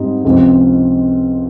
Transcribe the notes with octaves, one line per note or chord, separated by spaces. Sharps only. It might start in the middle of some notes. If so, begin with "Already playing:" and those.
Already playing: G#2 G3 C4 D#4
C#2 C3 F3 C4